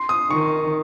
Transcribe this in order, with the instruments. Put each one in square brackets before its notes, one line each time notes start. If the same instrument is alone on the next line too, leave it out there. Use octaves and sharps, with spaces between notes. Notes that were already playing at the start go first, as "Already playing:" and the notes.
Already playing: [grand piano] C6
D#6
[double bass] D#3 [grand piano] C#6